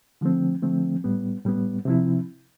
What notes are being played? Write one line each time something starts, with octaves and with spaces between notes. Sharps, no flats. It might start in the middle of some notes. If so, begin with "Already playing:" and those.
D3 F3 A3 C4
D3 F3 A3 C4
A2 G3 B3
A2 G3 B3
C3 F3 C4 E4